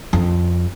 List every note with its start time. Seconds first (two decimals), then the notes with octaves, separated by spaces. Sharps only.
0.13 F2